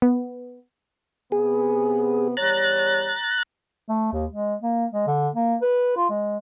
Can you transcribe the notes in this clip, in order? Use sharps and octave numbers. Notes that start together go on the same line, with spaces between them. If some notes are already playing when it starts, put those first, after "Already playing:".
B3
C3 B3 G#4
E2 G3 C#5 A#5 F#6 A6
A3
D#2
G#3
A#3
G#3
D3
A#3
B4
F4
G#3